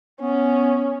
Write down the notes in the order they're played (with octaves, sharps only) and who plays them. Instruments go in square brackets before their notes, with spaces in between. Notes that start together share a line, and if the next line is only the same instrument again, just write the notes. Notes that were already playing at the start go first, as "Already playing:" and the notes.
[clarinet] B3 [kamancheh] C#4